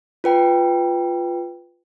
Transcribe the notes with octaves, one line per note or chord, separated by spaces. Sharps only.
F4 B4 G5